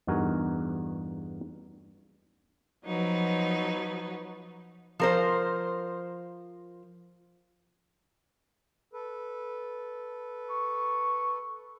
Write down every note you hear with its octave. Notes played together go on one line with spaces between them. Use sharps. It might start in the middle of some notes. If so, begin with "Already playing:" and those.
E2 G2 D#4 F#4 A#4 G#5
F3 F#3 B3 D#4
F3 A#4 C5
A4 B4
C#6